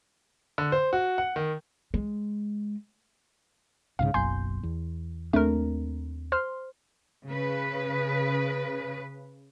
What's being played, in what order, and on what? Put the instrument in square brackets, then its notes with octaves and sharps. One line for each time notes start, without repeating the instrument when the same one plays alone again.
[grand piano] D3
C5
F#4
F#5
D#3
[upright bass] G#3
[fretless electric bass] C2 G#2 C#3 [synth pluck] F5
[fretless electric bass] F#1 B1 F#2 [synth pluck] G#5 C6 G6
[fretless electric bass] E2
[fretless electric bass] D#2 C4 D4 [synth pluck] A3 A#4
[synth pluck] C5 C6 F6
[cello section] C#3 B4